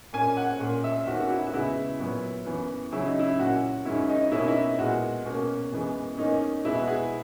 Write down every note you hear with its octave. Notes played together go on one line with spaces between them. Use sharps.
A#2 A#3 C#4 G#5
F#5
A#2 A#3 C#4
E5
E2 D#3 A#3 C#4 F#4
F#4
E4
F#4
C#3 G#3 B3 E4
A#2 F#3 B3
F#2 E3 B3
C#3 F#3 C#4 E4
D#4
E4
A#2 A#3 C#4 F#4
F#2 D#3 G#3 C#4 E4
D#4
B2 A#3 C#4 E4
D#4
E4
A#2 G#3 B3 F#4
B2 A#3 C#4
F#2 E3 G#3 B3
E2 D#3 A#3 C#4 D#4
B2 G#3 B3 E4
F#4
G#4